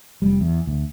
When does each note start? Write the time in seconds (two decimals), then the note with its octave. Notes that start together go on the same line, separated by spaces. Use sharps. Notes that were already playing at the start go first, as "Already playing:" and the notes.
0.22 F1 G3
0.41 E2
0.67 D2